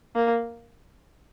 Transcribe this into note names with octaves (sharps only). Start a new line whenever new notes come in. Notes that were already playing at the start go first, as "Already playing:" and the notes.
A#3